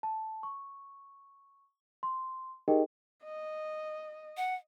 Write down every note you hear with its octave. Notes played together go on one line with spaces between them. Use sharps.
A5
C#6
C6
D#4 G4 G#4 A#4 D#5 G5
D#5
F#5